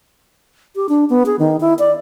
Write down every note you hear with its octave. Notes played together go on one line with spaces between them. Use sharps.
G4
D4
B3
G#4
D#3
E4
D5